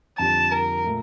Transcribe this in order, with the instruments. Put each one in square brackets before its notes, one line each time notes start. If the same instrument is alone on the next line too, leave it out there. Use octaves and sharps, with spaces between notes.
[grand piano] F2 D3 G3 [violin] A5
[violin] A#4
[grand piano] A#2 A3